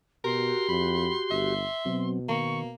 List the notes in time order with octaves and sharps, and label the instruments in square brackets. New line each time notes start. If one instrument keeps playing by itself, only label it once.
[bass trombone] B2 [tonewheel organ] F#4 G4 [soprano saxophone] A#4 [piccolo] C6
[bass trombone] F2 [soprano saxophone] B5
[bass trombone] G1 [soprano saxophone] E5
[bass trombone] B2 [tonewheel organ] F#3 C4
[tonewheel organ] D#3 [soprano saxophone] A#3 [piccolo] C#6